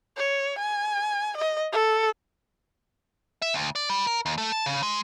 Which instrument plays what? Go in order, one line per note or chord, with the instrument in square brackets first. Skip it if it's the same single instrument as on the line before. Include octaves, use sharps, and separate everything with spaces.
[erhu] C#5
G#5
D#5
A4
[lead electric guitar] E5
D2
D5
G3
A#4
D#2
A3
A5
C#3
G#3